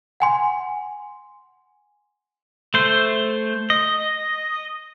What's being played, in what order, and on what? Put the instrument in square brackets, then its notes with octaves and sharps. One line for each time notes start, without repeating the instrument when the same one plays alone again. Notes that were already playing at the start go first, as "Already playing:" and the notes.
[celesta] F#5 G#5 C6
[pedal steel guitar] A3 C5
D#5